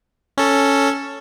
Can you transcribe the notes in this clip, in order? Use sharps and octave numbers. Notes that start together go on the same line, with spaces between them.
C#4 A4